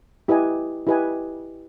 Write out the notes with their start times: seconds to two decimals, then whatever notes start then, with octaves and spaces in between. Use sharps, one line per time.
0.28 E4 G4 B4 D#5 G#5
0.87 E4 G4 B4 D#5 G#5